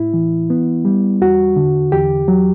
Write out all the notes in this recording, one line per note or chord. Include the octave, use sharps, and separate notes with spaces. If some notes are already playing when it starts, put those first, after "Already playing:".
Already playing: A2 E4
E3
B3
G3
E2 F#4
D3
E2 G4
F#3